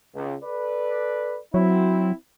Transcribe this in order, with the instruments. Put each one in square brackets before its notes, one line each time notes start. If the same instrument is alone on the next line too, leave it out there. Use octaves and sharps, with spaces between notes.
[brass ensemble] C#2
A4 B4 D5
[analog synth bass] F#3 [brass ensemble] C4 E4